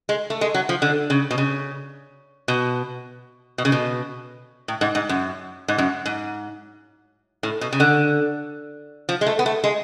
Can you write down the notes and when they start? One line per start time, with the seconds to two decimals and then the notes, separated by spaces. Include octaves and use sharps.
0.09 G#3
0.30 A3
0.41 G#3
0.54 F#3
0.69 F3
0.82 D3
1.10 C#3
1.31 B2
1.38 C#3
2.48 B2
3.58 B2
3.65 C#3
3.72 B2
4.68 A2
4.81 G#2
4.95 G#2
5.09 F#2
5.68 G#2
5.78 F#2
6.06 G#2
7.43 A2
7.61 B2
7.72 C#3
7.80 D3
9.09 F3
9.21 G#3
9.26 A3
9.39 B3
9.46 A3
9.64 G#3